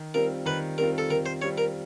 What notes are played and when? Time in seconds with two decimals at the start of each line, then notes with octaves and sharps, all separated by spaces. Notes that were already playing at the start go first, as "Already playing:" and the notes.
Already playing: D#3
0.14 G3 C4 F4 A#4
0.46 D#3 B4
0.78 G3 C4 F4 A#4
0.98 A4
1.10 D#3 A#4
1.26 C5
1.42 G3 C4 F4 C#5
1.58 A#4